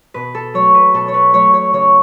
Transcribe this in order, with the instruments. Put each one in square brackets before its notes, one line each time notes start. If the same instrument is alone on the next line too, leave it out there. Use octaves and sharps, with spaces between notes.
[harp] B2 B4
A4
F#3 A3 C#5
B4
B2 A4
C#5
B4
F#3 A3 C#5
C#5
C#3 C#5